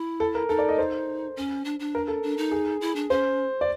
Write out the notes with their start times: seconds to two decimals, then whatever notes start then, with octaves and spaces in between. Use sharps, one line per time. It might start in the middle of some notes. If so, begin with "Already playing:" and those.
Already playing: E4
0.20 A4
0.35 A#4
0.49 D#4 A4
0.59 D5
0.69 D#5
0.78 C5
1.37 C#4
1.65 D4
1.79 D4
1.95 A#4
2.08 A4
2.23 D4
2.38 D#4
2.51 G#4
2.81 E4
2.96 D4
3.10 C#4 C5
3.61 D5